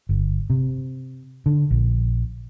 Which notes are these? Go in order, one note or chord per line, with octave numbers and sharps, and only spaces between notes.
G1
C3
D3
A#1